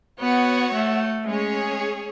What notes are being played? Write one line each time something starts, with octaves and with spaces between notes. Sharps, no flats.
B3 F#4 C#5 F#5
A3
G#3 C#4 G#4 C#5